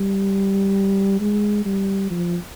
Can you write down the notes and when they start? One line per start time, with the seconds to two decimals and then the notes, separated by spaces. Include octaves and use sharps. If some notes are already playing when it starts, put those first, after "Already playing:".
Already playing: G3
1.21 G#3
1.65 G3
2.11 F3